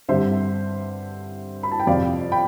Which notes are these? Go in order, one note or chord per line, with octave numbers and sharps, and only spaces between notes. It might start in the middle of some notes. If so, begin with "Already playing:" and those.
G2 D3 G3 C4 C5 E5
B5
A5
G5
F2 C3 F3 D5 F5
G5 B5